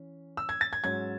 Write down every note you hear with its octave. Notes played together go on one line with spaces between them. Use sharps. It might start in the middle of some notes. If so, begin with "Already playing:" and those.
Already playing: E3 C#4
E6
G#6
A6
G#6
G#2 F#3 C#4 G#6